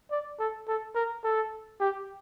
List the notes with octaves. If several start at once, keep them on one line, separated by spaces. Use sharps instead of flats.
D5
A4
A4
A#4
A4
G4